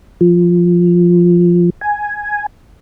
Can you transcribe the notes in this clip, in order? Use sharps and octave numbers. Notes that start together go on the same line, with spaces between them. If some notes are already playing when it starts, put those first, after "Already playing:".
F3
G#5